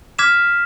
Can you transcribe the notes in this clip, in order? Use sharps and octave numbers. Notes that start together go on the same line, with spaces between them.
D6 F6 G#6 B6 E7